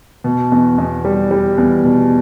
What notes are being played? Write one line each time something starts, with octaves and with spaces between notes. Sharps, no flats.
B2
E2
E2
G3
G3
E2
B2